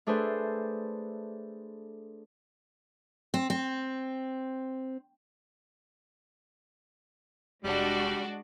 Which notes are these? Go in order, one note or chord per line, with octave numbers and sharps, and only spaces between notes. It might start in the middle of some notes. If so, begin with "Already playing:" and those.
A3 D4 G#4 A4 B4 C5
C4
C4
F1 G3 G#3 D4 F#4